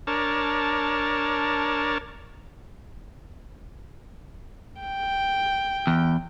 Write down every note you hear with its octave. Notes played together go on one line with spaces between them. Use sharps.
D4 A#4 C#5 A5
G5
E2